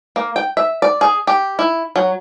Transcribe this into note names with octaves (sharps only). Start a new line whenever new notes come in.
A#3
G5
E5
D5
G#4
G4
E4
F#3